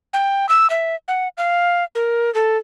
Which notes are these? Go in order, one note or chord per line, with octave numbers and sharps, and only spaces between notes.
G5
E6
E5
F#5
F5
A#4
A4